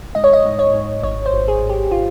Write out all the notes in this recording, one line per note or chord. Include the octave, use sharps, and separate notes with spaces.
G#2 D#5
C#5
D#5
G#2
C#5
G#2
G#1 C#5
C5
G#1
G#4
G#1
G4
F4